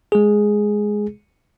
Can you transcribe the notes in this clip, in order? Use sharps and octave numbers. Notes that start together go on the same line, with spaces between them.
G#3 G#4